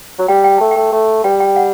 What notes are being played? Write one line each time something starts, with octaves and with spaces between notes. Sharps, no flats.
F#3
G3 G5
G5
A3 A5
G5
A3
A3
G3 G5
G5
F#5